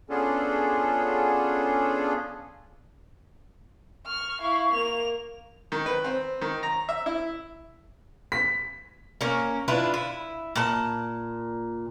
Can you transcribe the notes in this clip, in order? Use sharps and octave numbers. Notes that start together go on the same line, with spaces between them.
B3 C#4 D4 F4 G#4 A4
C#6 F6
E4 F5
A#3 F7
D#3
B4
C4
D#3
A#5
E5
E4
B6
A#3 C#4
D4 E4 F4 B4
E4
A#2 A5